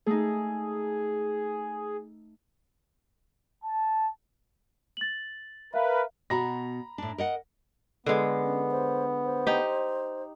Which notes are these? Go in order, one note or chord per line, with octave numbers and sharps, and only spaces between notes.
A3 D#4 G#4
A5
A6 F#7
A#4 B4 E5 F5
B2 F#4 A#5 B5 A#6
A2 D4
A#4 D#5 F#5
D3 G#3 B3
C#4
C5
C5
D#4 G4